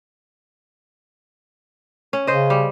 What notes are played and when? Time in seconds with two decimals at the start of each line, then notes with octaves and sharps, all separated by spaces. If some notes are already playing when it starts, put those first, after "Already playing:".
2.13 C#4
2.27 C#3 C5 D#5
2.50 G3